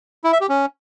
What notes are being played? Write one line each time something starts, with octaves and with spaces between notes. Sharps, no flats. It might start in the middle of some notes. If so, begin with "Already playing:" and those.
E4
E5
G4
C#4